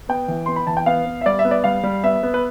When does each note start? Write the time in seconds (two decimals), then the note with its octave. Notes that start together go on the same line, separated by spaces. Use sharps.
0.09 B3 G5
0.28 E3
0.46 B3 C6
0.56 B5
0.67 E3 A5
0.77 G5
0.86 B3 F5
1.06 B3
1.21 E5
1.26 G3 D5
1.39 E5
1.45 B3
1.51 D5
1.64 G3 F5
1.83 G3
2.04 B3 E5
2.23 B3
2.34 B4